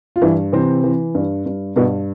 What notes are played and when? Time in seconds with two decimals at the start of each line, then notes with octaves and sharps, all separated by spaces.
0.16 F4
0.22 G2 E3 E4
0.52 C3 E3 C4
0.84 E3
1.15 G2
1.46 G2
1.76 G2 B2 B3